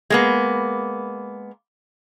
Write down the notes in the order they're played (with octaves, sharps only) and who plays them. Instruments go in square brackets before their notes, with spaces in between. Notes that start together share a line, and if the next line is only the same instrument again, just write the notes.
[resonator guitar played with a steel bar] G#3 A#3 B3